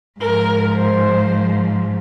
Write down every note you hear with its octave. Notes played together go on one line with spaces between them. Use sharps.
G#2 F3 A#4
C5